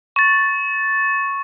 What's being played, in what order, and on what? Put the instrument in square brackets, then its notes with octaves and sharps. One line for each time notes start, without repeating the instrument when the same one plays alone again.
[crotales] C#6 A6